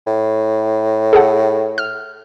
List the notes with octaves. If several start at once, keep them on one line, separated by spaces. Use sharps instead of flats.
A2
G#4 A4 F#5
F6